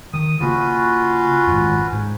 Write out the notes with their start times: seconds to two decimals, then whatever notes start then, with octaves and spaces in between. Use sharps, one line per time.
0.14 D#3 D#6
0.40 C#3 A#3 C#4 F4 F#4 B4
1.47 G#1 F#2
1.92 G#2